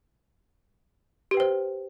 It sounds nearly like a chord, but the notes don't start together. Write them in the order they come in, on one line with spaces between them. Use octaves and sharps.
G4 B4 G5 C5